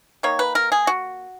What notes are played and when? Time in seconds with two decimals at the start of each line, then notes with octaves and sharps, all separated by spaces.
0.23 D#3 A#3 C#5
0.39 B4
0.55 A#4
0.72 G#4
0.87 F#4